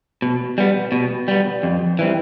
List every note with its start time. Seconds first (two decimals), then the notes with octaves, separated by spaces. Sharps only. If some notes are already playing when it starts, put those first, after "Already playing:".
0.22 B2
0.58 G3 B3
0.92 B2
1.28 G3 B3
1.63 F2
1.99 E3 G3 C4